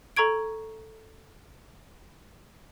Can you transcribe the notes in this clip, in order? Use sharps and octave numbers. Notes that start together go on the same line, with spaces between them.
A4 A#5 C#6 G#6 D7